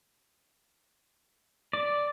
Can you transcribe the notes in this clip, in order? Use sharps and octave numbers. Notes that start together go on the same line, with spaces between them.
D5